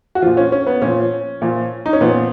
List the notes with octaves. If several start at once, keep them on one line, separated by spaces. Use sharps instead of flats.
F#4
A#2 F3 F4
C#4
C#4
B3
A#2 F3 C#4
A#2 F3
D#4
C#4
A#2 F3 B3